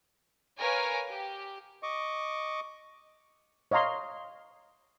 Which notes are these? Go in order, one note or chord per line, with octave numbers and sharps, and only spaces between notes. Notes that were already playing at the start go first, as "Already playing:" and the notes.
A#4 B4 C#5 F5 G#5
G4
D#5 C#6 D6
C#5 D#5 F5 A#5 C6